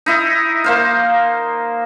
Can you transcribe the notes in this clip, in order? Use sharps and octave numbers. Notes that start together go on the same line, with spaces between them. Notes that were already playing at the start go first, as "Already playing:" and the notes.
D#4 E4 D#5
A#3 C5 F5